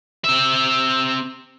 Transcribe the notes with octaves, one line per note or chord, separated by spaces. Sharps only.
C4 E5